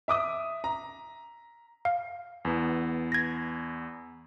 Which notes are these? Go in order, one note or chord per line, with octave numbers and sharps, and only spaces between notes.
E5 D6 D#6
A#5
F5
E2 B3
G#6 A#6